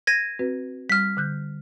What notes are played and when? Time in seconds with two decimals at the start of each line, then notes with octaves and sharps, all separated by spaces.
0.07 G#6 A#6 D#7
0.39 C4 F#4 B4
0.90 G3 F6 B6
1.17 D3 F#6 G6